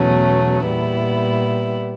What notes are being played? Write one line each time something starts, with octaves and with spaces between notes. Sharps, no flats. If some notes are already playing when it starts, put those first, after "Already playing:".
Already playing: E2 B2 F#3 A3 C#4
A#2 G3 B3 E4